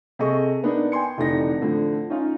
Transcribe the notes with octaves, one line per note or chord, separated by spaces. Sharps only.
C3 G#4 A4 D#5 C#6
A#3 B3 D4 D#4
G5 G#5 C6 C#7
F1 D3 E3 D4 D#4 A#6
A2 D3 F3
C#4 D#4 F4